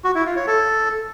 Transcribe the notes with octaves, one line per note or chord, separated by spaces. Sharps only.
F#4
E4
F4
C#5
A4